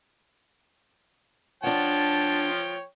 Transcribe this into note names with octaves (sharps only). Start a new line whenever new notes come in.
F3 D4 C#5 F#5 G5 A5